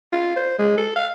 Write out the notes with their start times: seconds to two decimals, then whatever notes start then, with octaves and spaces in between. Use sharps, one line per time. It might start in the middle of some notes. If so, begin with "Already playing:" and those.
0.12 F4
0.37 C5
0.59 G#3
0.78 A4
0.96 F5